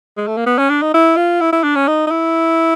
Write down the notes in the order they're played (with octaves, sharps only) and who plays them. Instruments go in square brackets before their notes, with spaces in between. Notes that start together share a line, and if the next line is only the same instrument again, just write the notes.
[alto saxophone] G#3
A3
A#3
B3
C#4
D4
D#4
E4
F4
E4
E4
D4
C#4
D#4
D#4
E4